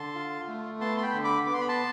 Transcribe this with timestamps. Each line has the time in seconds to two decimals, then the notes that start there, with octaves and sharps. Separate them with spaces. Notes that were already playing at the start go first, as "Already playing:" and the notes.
Already playing: D3 A5 C6
0.15 F4
0.48 A3
0.81 B3 A5 C6
0.98 C6
1.02 G5 B5
1.13 D3
1.24 B5 D6
1.46 B3 D6
1.54 C6
1.61 B5
1.69 A5 C6